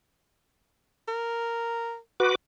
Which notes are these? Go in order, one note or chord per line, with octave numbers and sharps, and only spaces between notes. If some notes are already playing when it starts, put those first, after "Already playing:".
A#4
F#4 B4 D6